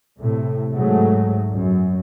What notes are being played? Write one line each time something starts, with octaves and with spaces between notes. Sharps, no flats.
A2 C3
G#2 F#3 A3
F#2